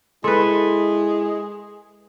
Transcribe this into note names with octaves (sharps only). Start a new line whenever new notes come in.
G#3 E4 A4 B4 C6